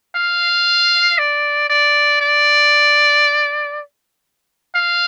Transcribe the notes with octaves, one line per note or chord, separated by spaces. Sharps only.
F5
D5
D5
D5
F5